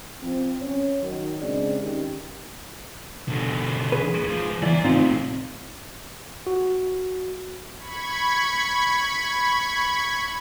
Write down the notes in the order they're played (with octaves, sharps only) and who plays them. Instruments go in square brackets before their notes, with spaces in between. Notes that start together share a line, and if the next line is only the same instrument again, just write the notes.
[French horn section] F3 C4
C#4 C#5
D#3 F#3
C#3 G#3 C4 D4 D5
D#3 C#4 G4
[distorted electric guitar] B2 D3
[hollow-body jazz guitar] G#4 B4
[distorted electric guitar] C#2 F3
[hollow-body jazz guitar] D3 E3 [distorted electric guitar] D5 A#5
[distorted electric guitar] A2 C3 [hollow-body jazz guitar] C4 D#4 F4
[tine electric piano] F#4
[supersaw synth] B5 C#6 G#6